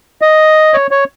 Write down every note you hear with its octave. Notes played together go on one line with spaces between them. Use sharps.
D#5
C#5
C#5